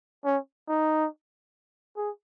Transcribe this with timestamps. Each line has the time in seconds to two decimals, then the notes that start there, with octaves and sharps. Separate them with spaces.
0.25 C#4
0.68 D#4
1.97 G#4